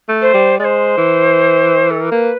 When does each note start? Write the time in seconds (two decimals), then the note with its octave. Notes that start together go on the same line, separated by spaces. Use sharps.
0.09 A3
0.21 C5
0.34 G3
0.59 G#3 C5 D5
0.98 E3
1.90 A4
2.00 A#4
2.12 A#3 B4